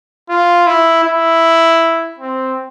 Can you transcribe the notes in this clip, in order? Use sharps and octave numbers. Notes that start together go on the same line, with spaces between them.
F4
E4
E4
C4